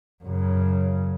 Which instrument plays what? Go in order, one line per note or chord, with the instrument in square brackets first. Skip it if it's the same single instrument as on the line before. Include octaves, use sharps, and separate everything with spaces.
[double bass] F#2 C#3